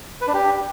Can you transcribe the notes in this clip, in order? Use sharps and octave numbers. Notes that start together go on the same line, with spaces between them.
B4
D4
G4